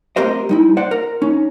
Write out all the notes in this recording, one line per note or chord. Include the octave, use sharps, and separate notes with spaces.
A3 C4 G4 A#4 C5 D#5
G3 D#4 E4
C5 D5 F#5
A#4
C#4 D#4